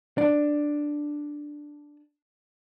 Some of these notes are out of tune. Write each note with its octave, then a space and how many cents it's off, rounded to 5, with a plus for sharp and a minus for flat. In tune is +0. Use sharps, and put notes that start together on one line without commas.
D4 +5